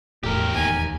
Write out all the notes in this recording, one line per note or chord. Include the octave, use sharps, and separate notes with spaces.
E1 E2 A2 G4 A#4
D#2 G#5